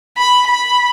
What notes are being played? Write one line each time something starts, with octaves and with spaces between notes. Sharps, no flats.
B5
B5